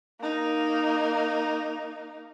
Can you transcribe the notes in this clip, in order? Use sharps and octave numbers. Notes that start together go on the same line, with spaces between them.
A#3 D#4